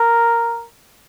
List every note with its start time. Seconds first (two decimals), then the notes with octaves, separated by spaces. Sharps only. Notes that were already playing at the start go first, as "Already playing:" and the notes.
Already playing: A#4